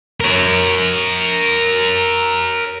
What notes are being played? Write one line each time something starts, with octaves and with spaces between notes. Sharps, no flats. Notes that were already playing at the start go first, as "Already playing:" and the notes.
A#4 C#5